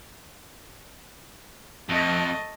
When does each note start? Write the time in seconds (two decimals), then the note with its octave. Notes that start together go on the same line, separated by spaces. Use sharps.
1.89 F2 A3 D#5